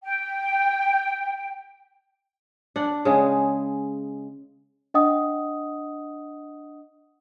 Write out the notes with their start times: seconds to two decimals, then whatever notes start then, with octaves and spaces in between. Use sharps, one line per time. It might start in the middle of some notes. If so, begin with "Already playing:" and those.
0.03 G5
2.76 D4 F#5
3.05 C#3 G#3
4.94 D4 D#5 F#5 D#6